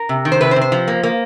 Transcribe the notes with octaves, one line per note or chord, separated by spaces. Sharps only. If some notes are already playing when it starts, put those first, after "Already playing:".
Already playing: A#4
C3
D#3
C5
C3 B4
C5
C3
C5
F3
A#3
A#3